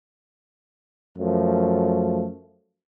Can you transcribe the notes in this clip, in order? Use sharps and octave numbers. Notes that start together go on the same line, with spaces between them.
F#2 F3 A3